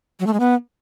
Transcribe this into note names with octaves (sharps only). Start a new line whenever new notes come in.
F#3
A3
G#3
B3